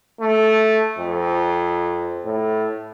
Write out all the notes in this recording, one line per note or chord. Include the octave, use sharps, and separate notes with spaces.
A3
F2
A2